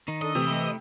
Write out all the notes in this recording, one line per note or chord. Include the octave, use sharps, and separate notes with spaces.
D#3 D#4
D4 A4 D#5
C3 E3 A3
A3 E4